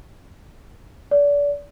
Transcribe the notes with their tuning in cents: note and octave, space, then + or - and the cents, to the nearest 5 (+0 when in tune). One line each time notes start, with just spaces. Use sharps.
D5 -30